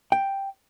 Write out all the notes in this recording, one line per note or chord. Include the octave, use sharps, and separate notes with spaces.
G5